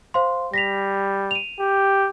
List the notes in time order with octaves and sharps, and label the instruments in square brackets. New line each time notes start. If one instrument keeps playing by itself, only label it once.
[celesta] C5 F5 C6
[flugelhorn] G3 [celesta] A#6 B6 F7
[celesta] D#7 F7
[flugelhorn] G4